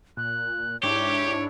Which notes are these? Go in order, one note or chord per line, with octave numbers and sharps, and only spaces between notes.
A#2 F#6
G#2 D4 E4 G4 C#5 D7